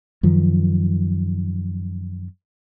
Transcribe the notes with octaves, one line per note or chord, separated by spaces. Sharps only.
F#2 D#3 F3